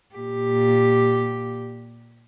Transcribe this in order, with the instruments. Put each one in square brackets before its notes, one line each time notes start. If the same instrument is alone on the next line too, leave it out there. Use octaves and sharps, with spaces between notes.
[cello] A#2 G4